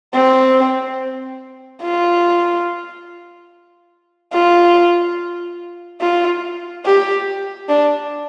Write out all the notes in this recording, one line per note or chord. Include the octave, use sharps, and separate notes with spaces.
C4
F4
F4
F4
G4
D4